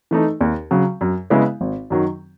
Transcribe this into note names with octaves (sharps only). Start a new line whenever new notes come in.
E3 A3 D#4
D#2
C#3 F#3
F#2
C#3 G#3 B3 E4
G#1
F#2 D#3 F#3